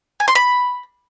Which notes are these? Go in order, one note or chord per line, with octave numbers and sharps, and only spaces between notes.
G#5
C6
B5